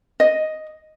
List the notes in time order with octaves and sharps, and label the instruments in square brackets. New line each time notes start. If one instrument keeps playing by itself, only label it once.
[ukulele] D#5